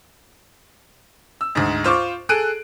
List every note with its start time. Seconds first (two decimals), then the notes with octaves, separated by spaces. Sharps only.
1.41 E6
1.55 D2 G#2
1.84 F4 C5 C#6 D6
2.29 G#4 A4 F#6 D7 D#7